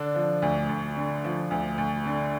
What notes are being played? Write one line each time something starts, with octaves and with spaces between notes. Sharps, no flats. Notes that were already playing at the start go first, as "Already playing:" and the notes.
Already playing: D3 D4
F3
D2
D2
D3
F3
D2
D2
D3